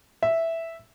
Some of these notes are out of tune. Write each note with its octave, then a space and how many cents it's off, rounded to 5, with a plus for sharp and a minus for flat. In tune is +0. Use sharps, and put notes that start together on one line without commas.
E5 +0